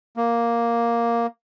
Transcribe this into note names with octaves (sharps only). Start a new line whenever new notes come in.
A#3